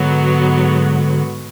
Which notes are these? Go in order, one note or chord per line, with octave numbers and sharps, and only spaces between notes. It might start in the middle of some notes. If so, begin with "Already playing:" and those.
Already playing: G#2 D3 F#3 B3